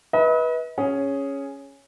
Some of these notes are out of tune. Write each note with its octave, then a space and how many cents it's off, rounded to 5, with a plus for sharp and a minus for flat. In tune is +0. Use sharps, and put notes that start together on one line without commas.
B4 -15 D#5 +40
C#4 +0 G#4 +0